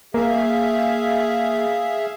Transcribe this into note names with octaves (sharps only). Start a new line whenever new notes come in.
A#3 G#4 E5 F5